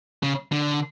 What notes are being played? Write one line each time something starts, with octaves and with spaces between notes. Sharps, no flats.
C#3
D3